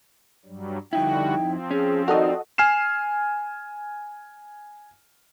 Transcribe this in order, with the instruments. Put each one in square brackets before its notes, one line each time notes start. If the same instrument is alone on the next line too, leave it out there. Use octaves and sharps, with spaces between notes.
[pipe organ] G2 F#3 G3
[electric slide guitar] F2 D#4 E4 [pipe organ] D3 G3 F#4 [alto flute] G5
[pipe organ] F3 C4
[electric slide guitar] C#4 [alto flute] G#4
[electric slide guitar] D#4 A#4 [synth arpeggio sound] F#4 A4 D#5 [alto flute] D5
[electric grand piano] G#5 F6 C7 E7